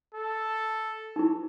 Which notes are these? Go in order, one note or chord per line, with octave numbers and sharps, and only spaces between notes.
A4
D#4 E4